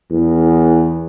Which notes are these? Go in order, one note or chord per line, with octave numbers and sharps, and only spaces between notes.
E2